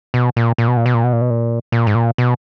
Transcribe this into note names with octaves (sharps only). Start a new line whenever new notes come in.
B2
A#2
A#2
B2
A#2
B2
A#2
B2
A#2
B2
A#2
A#2
G#2
A#2
B2